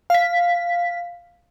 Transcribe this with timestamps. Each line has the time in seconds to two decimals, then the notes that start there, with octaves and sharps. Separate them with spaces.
0.10 F5 B6